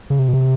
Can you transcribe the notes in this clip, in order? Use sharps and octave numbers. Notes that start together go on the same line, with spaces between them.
C#3
C3
B2
C3